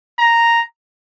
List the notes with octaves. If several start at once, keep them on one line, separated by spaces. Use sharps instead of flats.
A#5